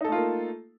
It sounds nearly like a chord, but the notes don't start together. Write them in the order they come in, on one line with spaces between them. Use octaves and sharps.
D#4 A4 A3 F4 A#3